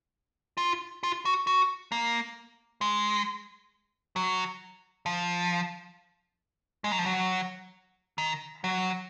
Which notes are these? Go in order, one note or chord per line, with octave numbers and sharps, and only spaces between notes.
F4
F4
F#4
F#4
A#3
G#3
F#3
F3
G#3
F#3
F3
F#3
D#3
F#3